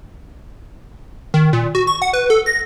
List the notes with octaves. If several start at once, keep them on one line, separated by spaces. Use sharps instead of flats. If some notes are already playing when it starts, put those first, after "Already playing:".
D#3
A#2
F#4
C#6
F#5
B4
A4
A#6